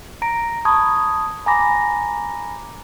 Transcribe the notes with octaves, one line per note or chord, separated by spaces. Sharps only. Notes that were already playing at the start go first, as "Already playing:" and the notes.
A#5 A#6 D7
A5 B5 C#6 D#6 G#6
G#5 A#5 B5 D6 A#6